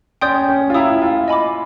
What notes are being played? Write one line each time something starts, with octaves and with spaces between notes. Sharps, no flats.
C#4 D5 G5 C6 D#6 G6
C#4
F4
E4 E5 G5 A#5 D#6
F4
D#5 G#5 B5 D6